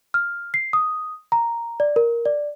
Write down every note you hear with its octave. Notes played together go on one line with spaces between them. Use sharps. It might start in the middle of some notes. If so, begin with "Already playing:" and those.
F6
C7
D#6
A#5
D5
A#4
D5